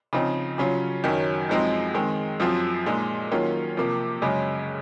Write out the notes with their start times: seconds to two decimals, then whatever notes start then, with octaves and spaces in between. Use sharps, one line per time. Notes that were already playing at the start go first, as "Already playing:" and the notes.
0.13 C#3 F3 C4 D#4
0.58 C#3 F#3 C#4 F4
1.04 F#2 D#3 F#3 C#4
1.49 F#2 F3 G#3 C4 D#4
1.94 D#3 G#3 C4
2.40 F#2 F3 C4 F4
2.86 A#2 G#3 D#4
3.32 D#3 F#3 A#3 C#4 F4
3.77 C3 F3 A#3
4.22 F#2 C#3 G#3 C#4